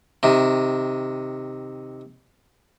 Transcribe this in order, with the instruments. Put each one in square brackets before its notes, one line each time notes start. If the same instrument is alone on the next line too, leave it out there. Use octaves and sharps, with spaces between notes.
[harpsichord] C3 D#3